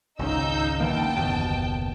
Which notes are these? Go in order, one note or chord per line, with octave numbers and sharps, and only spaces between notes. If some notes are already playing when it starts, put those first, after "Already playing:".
G#1 C#2 C#3 D#4 E6 G6
D3 E3 A#3 G5 A5
F#1 D#2 B2